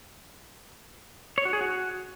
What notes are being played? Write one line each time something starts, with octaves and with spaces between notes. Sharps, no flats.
C#5
F#4
G#4
F#4